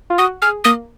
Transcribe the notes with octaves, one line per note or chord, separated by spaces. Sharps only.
F4
F#4 D#6
G#4 F6
A#3 D#6